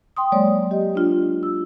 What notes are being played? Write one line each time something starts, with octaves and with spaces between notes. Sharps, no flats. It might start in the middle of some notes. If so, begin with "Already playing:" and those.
G5 C6 D#6
F#3 G#3 A#3 C#5 D5
G4 D#5
D4 F4
E6